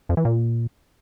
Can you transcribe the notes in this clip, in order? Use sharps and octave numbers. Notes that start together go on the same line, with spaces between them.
F2
E3
A#2